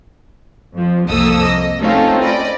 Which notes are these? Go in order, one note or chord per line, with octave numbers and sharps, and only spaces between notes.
F2 F3
C2 F2 A#3 A4 D#6 E6
D#5
A3 C4 C#4 D#4 F4 A4
D5 D#5 B5